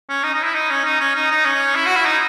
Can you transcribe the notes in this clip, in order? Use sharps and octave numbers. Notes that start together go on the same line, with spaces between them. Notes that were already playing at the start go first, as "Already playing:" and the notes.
C#4
D#4
D#4
E4
D#4
C#4
D#4
C#4
D#4
D#4
C#4
E4
F#4
E4
D#4